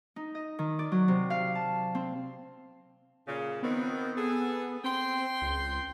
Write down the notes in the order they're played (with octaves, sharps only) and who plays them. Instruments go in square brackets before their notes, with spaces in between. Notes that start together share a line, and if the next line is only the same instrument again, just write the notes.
[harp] D#4
D#5
D#3
D5
F#3
C3
F5
A5
C4
[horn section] A#2 C#3
[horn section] D#3 C4 [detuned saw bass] B3
[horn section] G#4 A4
[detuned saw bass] C4 [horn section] G5 C6
[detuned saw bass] C#2